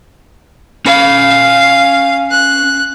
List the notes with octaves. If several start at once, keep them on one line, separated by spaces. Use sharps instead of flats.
C#4 F5 B5
F#6